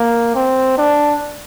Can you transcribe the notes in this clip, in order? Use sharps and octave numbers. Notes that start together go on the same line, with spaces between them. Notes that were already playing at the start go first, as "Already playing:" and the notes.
Already playing: A#3
C4
D4